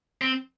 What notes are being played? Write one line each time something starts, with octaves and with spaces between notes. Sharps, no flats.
C4